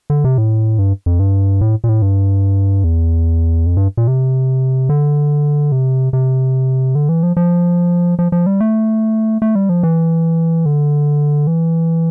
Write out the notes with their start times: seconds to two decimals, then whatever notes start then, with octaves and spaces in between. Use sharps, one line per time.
0.10 D3
0.24 C3
0.38 A2
0.78 G2
1.06 F2
1.20 G2
1.61 A2
1.84 A#2
1.89 A2
2.02 G2
2.84 E2
3.66 F2
3.77 G2
3.97 A#2
4.07 C3
4.89 D3
5.72 C3
6.13 C3
6.95 D3
7.09 E3
7.23 F3
7.37 F3
8.19 F3
8.32 F3
8.46 G3
8.60 A3
9.42 A3
9.55 G3
9.69 F3
9.83 E3
10.66 D3
11.47 E3